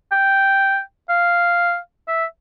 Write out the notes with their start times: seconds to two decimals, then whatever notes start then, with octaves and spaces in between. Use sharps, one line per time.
0.12 G5
1.09 F5
2.08 E5